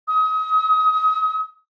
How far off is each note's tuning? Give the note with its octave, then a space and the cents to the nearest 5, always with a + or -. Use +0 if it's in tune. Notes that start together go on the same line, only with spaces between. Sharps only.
D#6 +35